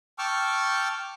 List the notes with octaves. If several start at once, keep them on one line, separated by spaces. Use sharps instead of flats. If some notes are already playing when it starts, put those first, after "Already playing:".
G5 A5 C#6 D6 E6 F6